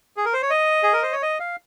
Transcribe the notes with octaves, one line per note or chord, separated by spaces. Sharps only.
G#4
A#4
C5
C#5
D#5
G#4
A#4
C5
C#5
D#5
F5